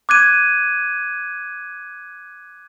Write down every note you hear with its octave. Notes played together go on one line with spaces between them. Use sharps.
D6 F#6 G#6 D#7